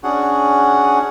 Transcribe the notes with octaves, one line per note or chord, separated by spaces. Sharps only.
C#4 D4 F#4 G#4 F#5